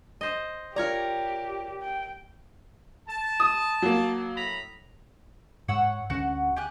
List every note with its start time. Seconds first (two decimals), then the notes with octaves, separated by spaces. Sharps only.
0.21 C5 D#5
0.76 F4 G4 A#4 C#5 D5 A#5
1.82 G5
3.08 A5
3.40 D#6
3.82 F#3 A#3
4.36 A2 A#5 B5
5.68 G#2 C#5 F#5 E6
6.10 D2 C#4 F#4 F#5
6.56 G4 G#5 F#6